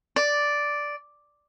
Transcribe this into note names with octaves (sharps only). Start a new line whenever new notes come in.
D5